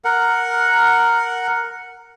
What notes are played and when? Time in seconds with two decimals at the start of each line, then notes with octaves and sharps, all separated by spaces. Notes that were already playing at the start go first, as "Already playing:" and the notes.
0.05 A#4 F#5